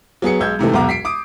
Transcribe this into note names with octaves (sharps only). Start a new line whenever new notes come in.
F#3 B3 G#4 C#7
B1 G#3 E6 G6 G#6
G#2 C3 E3 A3
E1 B1 B2 F#4 A#5 D6
B6 C7 D7
D6 D#6 D7